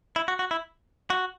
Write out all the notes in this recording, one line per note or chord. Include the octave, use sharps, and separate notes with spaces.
E4
F#4
F#4
E4
F#4